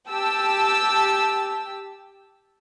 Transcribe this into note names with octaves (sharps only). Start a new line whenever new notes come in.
G4 A5 E6